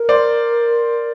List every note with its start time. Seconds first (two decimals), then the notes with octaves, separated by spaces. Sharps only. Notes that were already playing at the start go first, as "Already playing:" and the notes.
Already playing: A#4
0.09 C5 D5